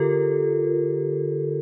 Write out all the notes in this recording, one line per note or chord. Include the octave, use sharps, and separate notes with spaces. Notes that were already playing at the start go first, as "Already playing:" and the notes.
Already playing: D3 F4 G4 A4 A#4